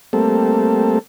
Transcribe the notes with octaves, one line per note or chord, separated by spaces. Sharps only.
G3 A3 A#3 C4 A4